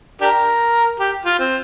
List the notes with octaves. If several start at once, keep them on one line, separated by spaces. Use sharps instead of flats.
D4 G4 A#4
G4
F4
C4